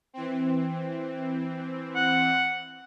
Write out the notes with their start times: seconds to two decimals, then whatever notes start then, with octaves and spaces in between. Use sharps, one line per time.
0.14 E3 C4
1.96 F#5